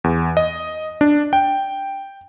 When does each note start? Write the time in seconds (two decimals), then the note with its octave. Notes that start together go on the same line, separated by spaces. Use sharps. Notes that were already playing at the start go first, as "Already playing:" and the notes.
0.04 E2
0.37 D#5
1.01 D4
1.33 G5